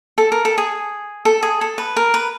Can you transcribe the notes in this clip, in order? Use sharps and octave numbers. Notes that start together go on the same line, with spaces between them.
A4
A#4
A4
G#4
A4
G#4
A4
B4
A#4
B4